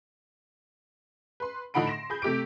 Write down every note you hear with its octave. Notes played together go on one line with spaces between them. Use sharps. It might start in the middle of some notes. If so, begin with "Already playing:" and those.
B4 C6
A2 D3 D#4 F#5 B5 D7
C6 A#6 E7
G#4 B5 G6
C3 A3 G4 D6 D7